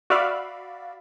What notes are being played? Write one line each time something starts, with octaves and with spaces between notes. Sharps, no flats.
F#4 D5 E5 F5 B5